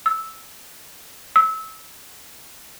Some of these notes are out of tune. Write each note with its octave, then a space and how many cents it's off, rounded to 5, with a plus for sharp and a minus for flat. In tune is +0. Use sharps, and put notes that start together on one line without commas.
E6 -10
E6 -25